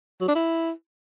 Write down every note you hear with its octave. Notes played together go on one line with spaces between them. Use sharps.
F#3
D4
E4